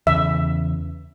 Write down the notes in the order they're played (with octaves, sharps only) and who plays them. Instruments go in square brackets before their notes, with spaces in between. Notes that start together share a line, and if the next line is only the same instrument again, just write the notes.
[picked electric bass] E2 C#3 [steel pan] E5